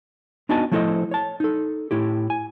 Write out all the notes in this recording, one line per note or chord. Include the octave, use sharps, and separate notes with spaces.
B3 D4 D#4 F#4 G#5 A5
F3 A3 E4 A4 C5 D#5
C#5 A5
D#4 A4
A2 E4 G4
G#5